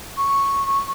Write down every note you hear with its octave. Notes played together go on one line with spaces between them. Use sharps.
C#6